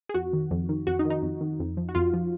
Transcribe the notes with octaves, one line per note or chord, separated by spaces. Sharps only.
G#4
F2 F#4
D#3
F2
D#3
F2 F#4
D#4
D#3
D#4
F2
D#3
F2
F3
F#4
F2 F4
F3